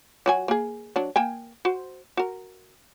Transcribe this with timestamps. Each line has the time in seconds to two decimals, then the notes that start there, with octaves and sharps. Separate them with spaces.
0.26 F#3 F#4 G#5
0.48 A#3 G#4
0.96 F#3 D4
1.16 A#3 G5 G#5
1.65 F#4 C5
2.17 F#4 A#4